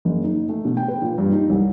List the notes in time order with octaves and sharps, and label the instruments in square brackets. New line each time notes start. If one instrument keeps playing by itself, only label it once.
[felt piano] F#1
D#4
A3
B2
G5
B4
A#2
G2
D#4
C2